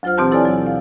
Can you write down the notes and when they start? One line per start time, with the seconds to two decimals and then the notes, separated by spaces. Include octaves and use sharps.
0.03 D2 F#3 F4 C5 F6
0.18 B2 E3 C4 G4 C5 A5
0.32 E4 A4 C#5 D5 G#5
0.45 F#3
0.66 F5